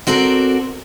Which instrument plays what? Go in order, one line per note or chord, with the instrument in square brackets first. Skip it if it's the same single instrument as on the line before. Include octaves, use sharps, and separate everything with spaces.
[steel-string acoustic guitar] C4 F#4 A4 A#4 D5